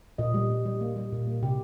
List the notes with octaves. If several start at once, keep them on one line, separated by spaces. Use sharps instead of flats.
A#2 D#5
G3
A#2
G3
A#3
G3
A#2
A#3
C3 G4